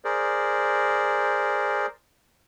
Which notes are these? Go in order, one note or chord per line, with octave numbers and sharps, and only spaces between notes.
G#4 A#4 C5 D5